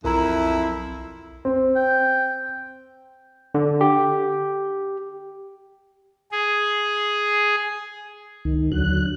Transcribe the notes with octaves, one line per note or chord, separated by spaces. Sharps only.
B1 F2 E4 A#4 A#5
C4
G5
D3
G4
G#4
C#2 D#3
D#2 D3 F#3 F#6